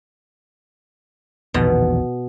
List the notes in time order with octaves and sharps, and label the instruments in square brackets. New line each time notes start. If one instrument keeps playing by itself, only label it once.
[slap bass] A#1 E2 D#3 [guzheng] B2